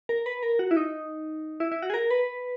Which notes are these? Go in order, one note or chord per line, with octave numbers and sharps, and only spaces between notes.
A#4
B4
A#4
F#4
E4
D#4
E4
E4
F#4
G#4
A#4
B4